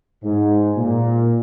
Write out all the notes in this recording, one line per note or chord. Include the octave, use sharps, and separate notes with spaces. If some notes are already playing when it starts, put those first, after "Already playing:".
G#2
A#2